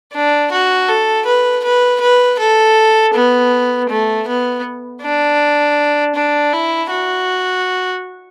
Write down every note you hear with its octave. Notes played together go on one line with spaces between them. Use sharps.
D4
F#4
A4
B4
B4
B4
A4
B3
A3
B3
D4
D4
E4
F#4